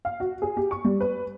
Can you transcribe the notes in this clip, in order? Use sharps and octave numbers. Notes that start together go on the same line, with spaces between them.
F5
F#4
G#4
G4
C#6
G3
B4